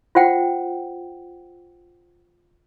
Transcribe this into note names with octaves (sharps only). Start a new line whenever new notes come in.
F4 C5 F#5 G5